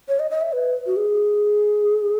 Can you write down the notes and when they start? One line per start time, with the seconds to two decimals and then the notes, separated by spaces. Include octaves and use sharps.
0.09 C#5
0.20 D#5
0.31 D#5
0.41 E5
0.53 B4
0.86 F#4
0.97 G#4